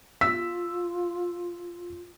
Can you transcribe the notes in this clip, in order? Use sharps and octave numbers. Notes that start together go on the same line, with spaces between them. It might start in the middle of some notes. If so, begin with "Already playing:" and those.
F4 E6 B6